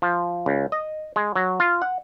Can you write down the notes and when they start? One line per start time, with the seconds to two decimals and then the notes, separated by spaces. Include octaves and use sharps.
0.02 F3
0.46 C#2
0.72 D#5
1.16 G#3
1.36 F#3
1.60 F4
1.82 F#5